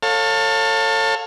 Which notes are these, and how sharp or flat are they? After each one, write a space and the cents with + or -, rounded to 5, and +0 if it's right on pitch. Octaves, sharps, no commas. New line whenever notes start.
A4 +25 C#5 -10 F5 +25